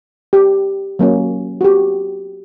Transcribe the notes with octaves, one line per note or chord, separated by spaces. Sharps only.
G4
F#3 A#3 C#4
F#4
G4